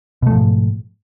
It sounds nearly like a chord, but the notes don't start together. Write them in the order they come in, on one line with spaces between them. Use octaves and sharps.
B2 A3 F3 G#2